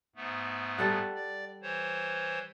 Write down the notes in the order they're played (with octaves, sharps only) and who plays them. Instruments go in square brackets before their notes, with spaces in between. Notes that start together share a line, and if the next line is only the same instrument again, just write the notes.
[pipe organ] G#2 A3 B3
[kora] G3 A4 F#5
[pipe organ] D5
E3 C5 C#5